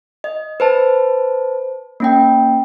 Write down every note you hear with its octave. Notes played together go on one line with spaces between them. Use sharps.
D#5
B4 C5 A5
A#3 C#4 G5